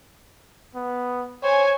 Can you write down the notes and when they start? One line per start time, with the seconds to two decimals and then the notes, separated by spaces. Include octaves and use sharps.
0.75 B3
1.43 C5 C#5 G#5